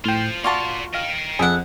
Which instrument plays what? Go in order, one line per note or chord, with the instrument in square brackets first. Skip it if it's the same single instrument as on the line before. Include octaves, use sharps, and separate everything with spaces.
[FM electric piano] A2 G5 [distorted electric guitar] F4 C5
[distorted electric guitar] A#3 C6 [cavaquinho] F4 F#4 A5 [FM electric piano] D5
[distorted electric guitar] D#5 G5 [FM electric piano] F5
[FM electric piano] C7
[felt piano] F2 [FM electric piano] G#4 [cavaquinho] E5 F#5